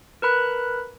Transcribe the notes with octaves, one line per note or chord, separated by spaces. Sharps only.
A#4 B4 B5 F#6